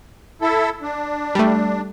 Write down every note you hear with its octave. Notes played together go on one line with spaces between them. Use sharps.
E4 A4
D4
G3 A3